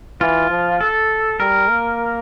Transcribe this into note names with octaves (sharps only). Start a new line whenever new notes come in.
E3 F4
F3
A4
G3 A#4
A#3